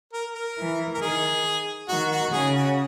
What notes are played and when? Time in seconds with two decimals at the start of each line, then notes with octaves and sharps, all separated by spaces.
0.13 A#4
0.34 A#4
0.58 E3
0.94 A#4
1.01 D#3 G#4
1.89 D#3 F#4
2.11 F#4
2.32 C#3 G#4
2.54 F#4